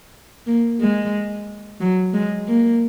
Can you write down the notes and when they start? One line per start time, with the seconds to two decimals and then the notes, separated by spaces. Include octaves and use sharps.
0.47 A#3
0.80 G#3
1.80 F#3
2.14 G#3
2.48 A#3